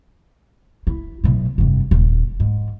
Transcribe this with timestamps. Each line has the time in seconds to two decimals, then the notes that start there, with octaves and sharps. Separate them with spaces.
0.87 E4
1.24 B1 A2
1.58 F1 G2
1.91 D#1
2.40 G#2